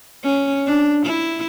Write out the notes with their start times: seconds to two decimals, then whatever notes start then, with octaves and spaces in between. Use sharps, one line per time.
0.24 C#4
0.66 D4
1.06 E4